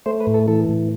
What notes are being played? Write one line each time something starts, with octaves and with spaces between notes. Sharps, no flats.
A3 C5
B4
A2
A4
E3 A4
A2